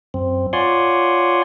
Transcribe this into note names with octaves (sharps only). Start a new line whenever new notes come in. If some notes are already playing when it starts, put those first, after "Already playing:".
F#2 C4
F4 C#5 D5 F#5 G#5 C6